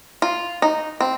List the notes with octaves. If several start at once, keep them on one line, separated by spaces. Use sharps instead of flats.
F4
D#4
C4